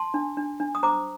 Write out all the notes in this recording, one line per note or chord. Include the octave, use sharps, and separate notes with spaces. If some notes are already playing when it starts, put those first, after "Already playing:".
Already playing: A5 C6
D4
D4
D4
D#6
C5 A#5 D6